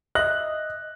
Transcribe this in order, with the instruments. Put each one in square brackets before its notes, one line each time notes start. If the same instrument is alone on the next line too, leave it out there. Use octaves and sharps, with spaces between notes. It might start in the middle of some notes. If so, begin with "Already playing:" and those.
[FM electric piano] D#5 E5 [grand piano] F#6 A#6 F#7